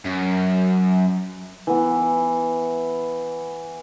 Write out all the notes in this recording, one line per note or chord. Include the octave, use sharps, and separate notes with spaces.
F#2
E3 B3